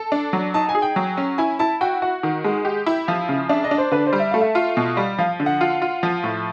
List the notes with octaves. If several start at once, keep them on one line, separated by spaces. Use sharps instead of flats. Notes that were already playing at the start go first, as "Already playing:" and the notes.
Already playing: A4
D4
F#3
D#4 A5
G#5
G#4
G5
F#3
C#4
E4 G#5
E4 A5
F#4 G5
F#4 F#5
D#3
G#3
G4
E4
F3 F5
C#3
D4 E5
D#5
D4
C5
D3 B4
C5
G3
E5
A3 F5
E5
F4
B2
G3
F3 F5
D3
F#5
F4
F4
F3
A2